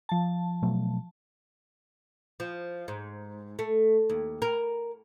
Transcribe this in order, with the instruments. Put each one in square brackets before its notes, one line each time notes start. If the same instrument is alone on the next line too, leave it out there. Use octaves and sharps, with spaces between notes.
[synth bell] F3 A5
[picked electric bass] B2 F#3 A3
[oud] F3
G#2
A3
D#2
A#4